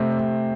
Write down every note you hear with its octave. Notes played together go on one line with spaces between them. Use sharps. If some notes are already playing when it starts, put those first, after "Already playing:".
Already playing: C3 A3 C4
C3